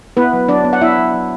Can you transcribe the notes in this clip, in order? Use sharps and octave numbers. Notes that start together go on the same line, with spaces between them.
B3 E4 B4
F#3
F#3 D4 D5
B3
F#5
B3 E4 E5
F#3
F#3